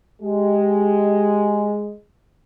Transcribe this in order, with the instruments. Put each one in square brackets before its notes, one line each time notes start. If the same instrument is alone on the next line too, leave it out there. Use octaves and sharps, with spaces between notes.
[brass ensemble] G#3 [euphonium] G4